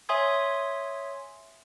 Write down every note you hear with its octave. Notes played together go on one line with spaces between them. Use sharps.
C#5 E5 G#5 C6 D#6 G#6